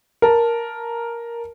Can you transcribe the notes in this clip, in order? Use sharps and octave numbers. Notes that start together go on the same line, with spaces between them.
A#4 A5